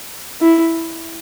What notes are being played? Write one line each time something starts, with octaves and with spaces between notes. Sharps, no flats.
E4